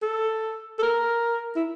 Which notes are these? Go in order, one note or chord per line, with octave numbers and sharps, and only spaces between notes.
A4
A4
A#4
E4